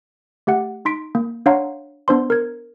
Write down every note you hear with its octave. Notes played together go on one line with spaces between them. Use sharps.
A3 G4 F#5
D#4 C6 B6 D7
A#3
D4 C#5 F5 F#5 A#5 C6
B3 D4 C5 C6
A#4 G#6